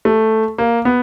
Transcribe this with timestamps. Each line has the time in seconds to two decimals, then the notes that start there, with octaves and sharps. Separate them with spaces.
0.05 A3
0.58 A#3
0.85 B3